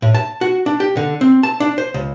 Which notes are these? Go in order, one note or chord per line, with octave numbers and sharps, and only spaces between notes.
A2
A5
F#4
D4
G4
D3
C4
A5
D4
C5
C#2